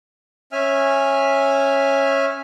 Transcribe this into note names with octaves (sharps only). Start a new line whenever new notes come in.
C#4 E5 G#5 F6